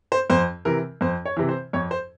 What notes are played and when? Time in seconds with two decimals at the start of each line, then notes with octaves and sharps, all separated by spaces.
0.12 C5
0.30 F2 C5
0.65 C3 E3 A#4
1.01 F2 C5
1.25 C#5
1.37 C3 E3
1.49 C5
1.73 F2 C#5
1.91 C5